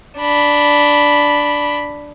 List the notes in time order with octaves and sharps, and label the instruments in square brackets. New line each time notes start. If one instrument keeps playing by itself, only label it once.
[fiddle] D4 B5